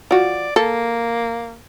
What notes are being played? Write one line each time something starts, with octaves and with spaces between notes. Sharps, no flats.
F3 F#4 D5
A#3 A4